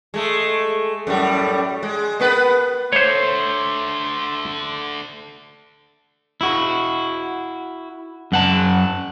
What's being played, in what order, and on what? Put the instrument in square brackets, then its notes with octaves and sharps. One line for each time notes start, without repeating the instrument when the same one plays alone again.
[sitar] G#3 A3
F#2 A2 G3
G#3
A#3 B3 B4
[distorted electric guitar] D3 A3 [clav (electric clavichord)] C5 C#5 [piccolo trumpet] C6
[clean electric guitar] E4 F#4
F#2 F#5 A5